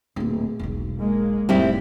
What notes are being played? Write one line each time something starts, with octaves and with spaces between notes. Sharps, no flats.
D1 A#2
E1 B1
G#3 A#3
F1 A2 G3 C4 E4